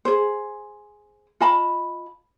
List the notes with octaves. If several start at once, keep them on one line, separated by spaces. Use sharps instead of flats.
G#4 C5
F4 D#5 A5 B5